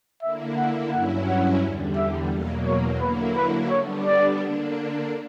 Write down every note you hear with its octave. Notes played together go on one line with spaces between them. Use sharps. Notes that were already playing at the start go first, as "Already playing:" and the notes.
D3 A#3 E4 E5
F#5
G2 F#3 C#4 E4 F#5
F#5
E2 D3 G3
E5
E2 B2 F#3 A#3
C#5
D3 F#3 A#3 E4 B4
B4
D3 G3 B3 D4 C#5
D5
D3 A#3 D4